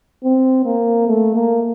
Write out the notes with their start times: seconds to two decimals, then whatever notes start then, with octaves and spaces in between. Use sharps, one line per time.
0.23 C4
0.65 A#3
1.07 A3
1.35 A#3